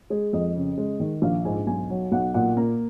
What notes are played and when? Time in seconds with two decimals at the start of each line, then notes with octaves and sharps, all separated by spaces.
0.10 G#3 G#4
0.33 F2 D#5
0.56 C#3
0.78 G#3
1.00 D#3
1.22 A#1 F5
1.45 G#2 G#5
1.67 B1 G#5
1.90 F#3
2.12 B1 F#5
2.34 A#2 F#5
2.57 A#3 A#5